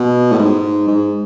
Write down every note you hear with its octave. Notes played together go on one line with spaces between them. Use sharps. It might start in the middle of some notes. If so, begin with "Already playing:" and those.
Already playing: B2
A2
G#2
G#2